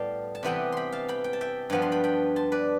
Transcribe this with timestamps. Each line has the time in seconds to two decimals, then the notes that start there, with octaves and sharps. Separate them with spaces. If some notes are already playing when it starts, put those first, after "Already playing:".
Already playing: A2 G3 B3 D5 F5 G5 A5
0.35 A5
0.43 C3 E3 B3 G5 B5
0.72 G5 B5 C6
0.92 F5 A5
1.08 G5 B5
1.24 G5
1.33 A5
1.41 E5 G5
1.70 G2 F3 B3 B5
1.82 C6
1.92 G5 B5
2.04 G5 B5
2.36 A5 C6
2.52 B4 D5